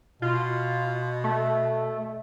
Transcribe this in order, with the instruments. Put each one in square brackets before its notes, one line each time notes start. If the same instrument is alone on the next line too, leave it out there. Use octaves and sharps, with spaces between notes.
[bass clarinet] B2 [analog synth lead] F4
[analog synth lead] A3